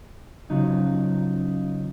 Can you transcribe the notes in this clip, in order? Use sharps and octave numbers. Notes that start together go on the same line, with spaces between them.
C#3 F3 F#3 D#4